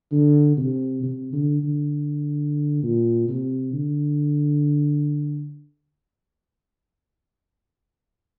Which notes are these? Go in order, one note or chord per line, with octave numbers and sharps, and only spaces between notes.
D3
C3
C3
D3
D3
A#2
C3
D3